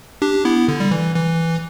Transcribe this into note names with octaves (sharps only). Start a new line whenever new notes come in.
D4 G4
B3 E4
D3
G3
E3
E3